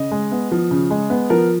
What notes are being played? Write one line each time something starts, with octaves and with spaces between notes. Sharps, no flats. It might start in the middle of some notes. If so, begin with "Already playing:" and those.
Already playing: C#3 D#5
G#3
B3
F3
C#3
G#3
B3
F3 A#4